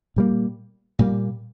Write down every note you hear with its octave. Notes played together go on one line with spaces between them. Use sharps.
A#2 G3 A#3
A#2 G3 A#3